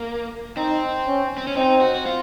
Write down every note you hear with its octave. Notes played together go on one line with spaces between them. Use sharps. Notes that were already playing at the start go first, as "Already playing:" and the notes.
Already playing: A#3
C4 D#4
C#4
C4
C#4
C4 D#4
F#4
F#4
F4